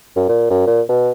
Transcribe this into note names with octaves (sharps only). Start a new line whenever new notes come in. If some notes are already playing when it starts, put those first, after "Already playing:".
F#2
A#2
F#2
A#2
B2